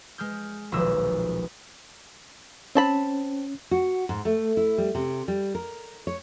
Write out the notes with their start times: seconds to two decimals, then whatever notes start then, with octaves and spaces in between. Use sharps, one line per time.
0.18 G#3 F6 G6
0.72 D#1 B1 F3 D#5 E6
2.75 C4 C#4 A5 B5
3.71 F#4
4.09 G#2
4.25 A3
4.57 E4
4.78 G3
4.95 C3
5.28 G3
5.55 A#4
6.07 C#5